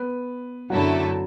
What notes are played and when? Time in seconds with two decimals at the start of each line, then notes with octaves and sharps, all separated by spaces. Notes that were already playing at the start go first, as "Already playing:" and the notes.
Already playing: B3 B4
0.70 F#2 D3 F#3 A3 E4 F#4 A4